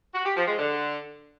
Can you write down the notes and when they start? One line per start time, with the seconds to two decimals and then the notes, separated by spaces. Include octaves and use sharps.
0.14 F#4
0.25 G4
0.36 F3
0.48 G#3
0.59 D3